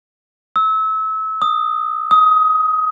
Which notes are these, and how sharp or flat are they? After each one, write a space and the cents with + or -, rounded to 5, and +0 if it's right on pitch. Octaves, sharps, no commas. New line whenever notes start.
E6 -30
D#6 -10
D#6 +20